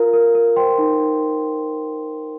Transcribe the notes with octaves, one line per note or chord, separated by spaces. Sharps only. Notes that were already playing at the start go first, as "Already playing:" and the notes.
Already playing: F4 A#4 F5 A#5
A#4
A#4
C5 G5 C6
D#4
D#4